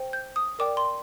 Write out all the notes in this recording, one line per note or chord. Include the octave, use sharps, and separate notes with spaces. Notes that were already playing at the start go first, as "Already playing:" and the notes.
Already playing: C5 G5
G6
D#6
A#4 D5 G5 D6
C6